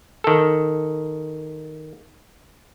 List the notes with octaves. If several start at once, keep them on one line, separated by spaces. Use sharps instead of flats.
D#3 A4